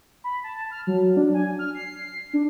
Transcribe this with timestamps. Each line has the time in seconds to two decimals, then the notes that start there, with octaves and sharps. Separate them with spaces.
0.24 B5
0.44 A5
0.71 F6
0.87 F#3
1.17 D4
1.34 G#5
1.59 F6
1.74 C7
2.33 D4